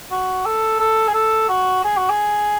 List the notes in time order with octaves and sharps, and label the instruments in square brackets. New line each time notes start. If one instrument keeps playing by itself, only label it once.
[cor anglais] F#4
A4
A4
G#4
A4
F#4
G#4
F#4
G#4